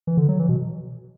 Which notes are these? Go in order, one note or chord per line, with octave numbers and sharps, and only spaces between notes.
E3
D3
F#3
E3
B2